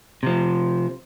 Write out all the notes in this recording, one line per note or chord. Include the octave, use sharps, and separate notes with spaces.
C3 F3